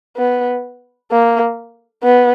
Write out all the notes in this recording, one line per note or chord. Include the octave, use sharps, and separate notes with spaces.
B3
A#3
B3